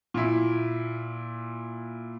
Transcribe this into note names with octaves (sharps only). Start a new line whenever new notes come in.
A#2 E4